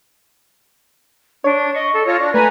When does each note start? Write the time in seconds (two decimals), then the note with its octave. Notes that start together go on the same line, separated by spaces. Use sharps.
1.44 D4 C#5
1.75 D#5 C#6
1.93 A4
2.07 F4 C#5 A#6
2.20 D4
2.34 A3 B4 G#5 A#5